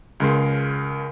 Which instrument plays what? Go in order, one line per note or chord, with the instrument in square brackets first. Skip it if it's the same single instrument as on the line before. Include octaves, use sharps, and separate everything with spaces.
[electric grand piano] C#2 C#3 A#4 C6 C7